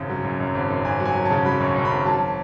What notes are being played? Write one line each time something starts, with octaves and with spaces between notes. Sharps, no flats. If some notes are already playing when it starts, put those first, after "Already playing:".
Already playing: G#1 F#2 C#3
F#3
F#2
F#2
G#1
F#2
G#1 G#5
F#3
G#5
F#3
A5
C#3
F#3 B5
F#2 C#6
F#2
B5
G#1
F#3 A5